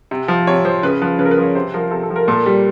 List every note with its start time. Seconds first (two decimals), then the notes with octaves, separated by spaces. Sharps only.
0.11 C3
0.28 F3
0.47 C3 C#5
0.65 F3 C5
0.83 C#3 B4
1.02 F3 B4
1.19 C#3 B4
1.25 A#4
1.31 B4
1.38 F3
1.43 C#5
1.55 C3 C5
1.74 F3 A#4
1.91 C3 A4
2.03 A4
2.10 F3
2.16 A#4
2.28 A#2 A4
2.46 G3